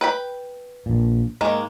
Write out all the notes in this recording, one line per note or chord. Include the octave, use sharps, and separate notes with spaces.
B4 G5 B5
A#1 A#2
G#2 D#3 G#3 A#3